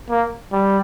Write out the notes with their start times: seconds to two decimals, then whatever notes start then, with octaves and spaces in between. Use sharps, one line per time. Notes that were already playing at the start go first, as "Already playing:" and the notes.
0.10 A#3
0.53 G3